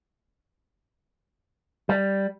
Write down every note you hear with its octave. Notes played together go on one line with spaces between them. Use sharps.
G3